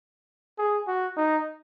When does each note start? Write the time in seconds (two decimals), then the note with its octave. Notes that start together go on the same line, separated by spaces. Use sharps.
0.59 G#4
0.88 F#4
1.17 D#4